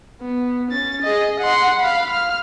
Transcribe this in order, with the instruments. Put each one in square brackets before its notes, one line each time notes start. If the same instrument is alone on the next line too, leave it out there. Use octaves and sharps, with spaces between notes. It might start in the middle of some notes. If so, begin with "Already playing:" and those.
[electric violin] B3
C#4 A6
G#4 D#5
F#5 C6
F5 B5
F6